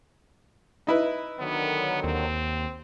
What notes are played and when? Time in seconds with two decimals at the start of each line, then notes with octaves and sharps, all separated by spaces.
0.87 D#4 E4 B4
1.39 D3 D#3 F#3 B3
2.04 D#2 C4